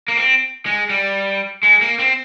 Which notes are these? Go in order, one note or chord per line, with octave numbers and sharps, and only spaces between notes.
A#3
C4
G#3
G3
G#3
A#3
C4